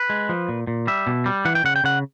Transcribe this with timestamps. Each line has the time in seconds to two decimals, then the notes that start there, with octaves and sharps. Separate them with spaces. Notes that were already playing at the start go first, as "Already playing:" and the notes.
Already playing: B4
0.10 G#3
0.29 F3
0.49 A#2
0.67 A#2
0.87 G3 E5
1.07 B2
1.26 G3
1.45 E3 F#5
1.55 G5
1.64 C#3 F#5
1.76 G5
1.84 C#3 F#5